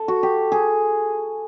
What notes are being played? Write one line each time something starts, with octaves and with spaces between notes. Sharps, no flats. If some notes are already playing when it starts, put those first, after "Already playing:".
Already playing: A4
F#4
G4
G#4